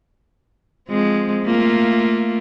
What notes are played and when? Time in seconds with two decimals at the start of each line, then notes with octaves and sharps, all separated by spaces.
0.89 F3 G#3 C4
1.45 A3 A#3 F4